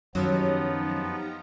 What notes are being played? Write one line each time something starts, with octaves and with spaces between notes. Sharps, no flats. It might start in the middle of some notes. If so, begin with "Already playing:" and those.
F#2 D#3 F3 F#3 B3 D#4 G4 A#5